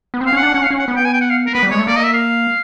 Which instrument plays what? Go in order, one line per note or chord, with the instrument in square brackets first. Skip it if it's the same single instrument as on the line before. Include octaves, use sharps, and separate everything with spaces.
[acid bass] B3
C4
[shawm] F5
[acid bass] C#4 [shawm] F#5
[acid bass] D4
[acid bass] C#4 [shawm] F#5
[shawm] F5
[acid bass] C#4
[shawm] F#5
[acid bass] B3
[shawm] G5
G#5
G5
F#5
F5
A#4
[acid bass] B3 [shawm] B4
[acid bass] G3
[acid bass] G#3 [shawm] C#5
[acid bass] A3
[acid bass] A#3 [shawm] D5
[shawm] D#5
E5
F5